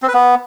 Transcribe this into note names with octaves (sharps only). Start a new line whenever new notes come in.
C4
B4
B3